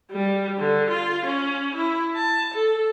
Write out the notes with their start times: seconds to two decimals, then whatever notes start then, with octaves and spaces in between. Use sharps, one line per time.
0.11 G3
0.58 D3
0.90 F4
1.25 C#4
1.74 E4
2.15 A5
2.54 A4